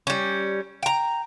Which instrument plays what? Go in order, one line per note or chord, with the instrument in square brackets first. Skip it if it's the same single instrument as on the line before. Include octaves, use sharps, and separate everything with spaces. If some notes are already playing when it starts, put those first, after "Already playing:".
[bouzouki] G3 C#4
G5 A#5